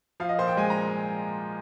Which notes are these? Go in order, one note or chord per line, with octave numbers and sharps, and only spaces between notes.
F3 F5
D#5
A#2 C5
G5
G#3 G#5
A#5
A#2